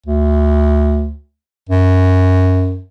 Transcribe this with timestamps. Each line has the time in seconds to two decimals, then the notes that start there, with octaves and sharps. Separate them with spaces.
0.06 D2
1.69 F#2